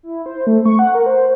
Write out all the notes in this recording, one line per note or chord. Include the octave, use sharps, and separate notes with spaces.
E4
C5
A3
C#6
F#5
A#4
C5